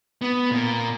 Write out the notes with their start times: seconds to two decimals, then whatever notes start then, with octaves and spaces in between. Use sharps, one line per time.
0.22 B3
0.51 A#2